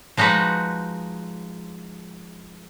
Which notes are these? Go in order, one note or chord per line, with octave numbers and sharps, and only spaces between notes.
F3 G#3 D#4 F#4 B4